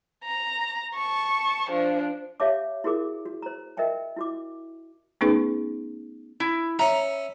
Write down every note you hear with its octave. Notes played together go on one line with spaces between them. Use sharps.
A#5
A5 C#6
F3 D4
G4 C#5 E5 F5 A5 D6
E4 F#4 G#4 A#4 D6
F#4
C5 A#5
A#4 D#5 E5 G5 A5
E4 F#4 D6
A3 B3 C#4 D#4 G#4 B4
E4
C#4 E5 A#5